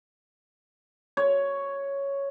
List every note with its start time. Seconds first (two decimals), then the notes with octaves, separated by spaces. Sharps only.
1.17 C#5